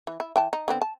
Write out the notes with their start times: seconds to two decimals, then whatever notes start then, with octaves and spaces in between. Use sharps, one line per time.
0.07 E3
0.20 E4
0.36 E3 G5 A5
0.53 D#4
0.68 D3 B3 C4
0.82 A5